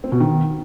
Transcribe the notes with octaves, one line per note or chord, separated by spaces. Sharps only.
C4
B2
D#3